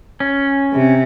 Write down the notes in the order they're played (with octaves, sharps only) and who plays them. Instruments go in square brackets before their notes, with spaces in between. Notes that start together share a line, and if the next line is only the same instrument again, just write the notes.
[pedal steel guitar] C#4
[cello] C3